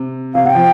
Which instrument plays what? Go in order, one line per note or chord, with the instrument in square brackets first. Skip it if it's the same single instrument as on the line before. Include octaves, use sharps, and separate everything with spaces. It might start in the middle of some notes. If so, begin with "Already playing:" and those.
Already playing: [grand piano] C3
[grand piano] C3 [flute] F5
[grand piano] C3 [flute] F#5
[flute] G5
[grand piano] F3